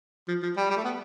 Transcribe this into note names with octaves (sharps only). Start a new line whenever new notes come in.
F3
F3
G3
G3
A3
B3